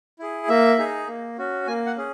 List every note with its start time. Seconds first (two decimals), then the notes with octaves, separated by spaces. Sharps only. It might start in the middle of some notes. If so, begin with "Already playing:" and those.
0.19 E4 G#4
0.49 A#3 E5
0.78 D#4 G#4
1.07 A#3
1.38 C#4 F#4
1.67 A#3 G#5
1.86 F#5
1.96 C#4 G#4